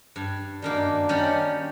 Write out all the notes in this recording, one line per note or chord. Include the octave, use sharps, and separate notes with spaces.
G2
F#2 D#3 A#3 D4
D#3 G3 C#4